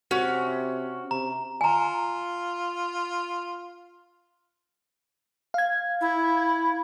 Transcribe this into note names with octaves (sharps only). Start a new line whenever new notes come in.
C3 C#4 F#4
C3 A#5
F4 G#5 A#5
F5 G#6
E4